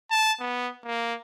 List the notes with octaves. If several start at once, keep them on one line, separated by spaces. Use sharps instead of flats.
A5
B3
A#3